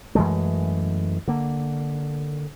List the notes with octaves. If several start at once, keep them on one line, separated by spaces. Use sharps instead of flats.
F#2 E3 G#3 A3
D3 A#3